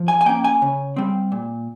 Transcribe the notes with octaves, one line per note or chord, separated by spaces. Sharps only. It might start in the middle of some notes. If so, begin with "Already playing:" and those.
Already playing: F3
G#5
G#5
A#3 C#4 G5
G#5
C#3
G3 C4
A#2